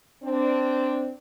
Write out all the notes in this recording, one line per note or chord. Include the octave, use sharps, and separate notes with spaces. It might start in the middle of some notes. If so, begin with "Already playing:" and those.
C4 D4